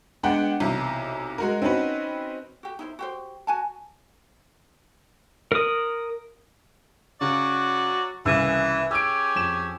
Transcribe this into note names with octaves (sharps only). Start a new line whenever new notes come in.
G#3 B3 D4 F#5 G5
B1 C3 E3
G#3 F#4 A#4
C4 C#4 D#4 F#4 B4
F#4 G4
D#4 E4 C5
F#4 G4 C5
F#4 G#5 A5
A#4 D#6
C#3 F#3 F#4 D5
C2 C#3 E3 E6
C#4 G4 G#4 E6 D7
F2 E7